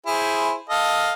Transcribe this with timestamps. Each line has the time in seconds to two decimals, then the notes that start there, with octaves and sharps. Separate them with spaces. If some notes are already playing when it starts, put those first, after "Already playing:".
0.06 E4 G#4 C5
0.69 A4 D#5 F5